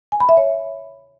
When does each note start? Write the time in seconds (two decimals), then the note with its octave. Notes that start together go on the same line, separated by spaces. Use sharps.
0.12 G#5
0.20 B5
0.29 E5
0.37 C#5